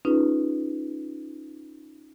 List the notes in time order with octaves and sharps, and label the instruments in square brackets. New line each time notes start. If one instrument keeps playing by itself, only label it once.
[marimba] C#4 D#4 F4 G#4 B4